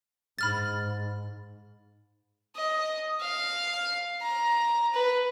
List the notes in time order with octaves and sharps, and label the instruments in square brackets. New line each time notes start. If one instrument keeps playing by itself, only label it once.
[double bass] G#2 [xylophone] B5 F6 A6
[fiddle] D#5
F5
A#5
B4